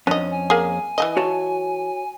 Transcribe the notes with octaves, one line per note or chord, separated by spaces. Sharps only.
F2 C#4 D4 D#5
G#5
A#3 G#4
E3 A3 D#5
F#4 C#5 A5